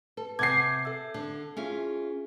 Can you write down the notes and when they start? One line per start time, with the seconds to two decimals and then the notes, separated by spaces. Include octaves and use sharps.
0.17 A4 B4
0.39 C3 F#5 G#5 D6 G6 G#6 C7
0.85 A4 E5 E6
1.14 D3 A4
1.57 C#4 F4 G#4 E5